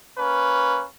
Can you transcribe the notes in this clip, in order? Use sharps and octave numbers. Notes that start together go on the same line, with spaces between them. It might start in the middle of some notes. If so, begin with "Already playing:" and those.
A#3 C#4 B4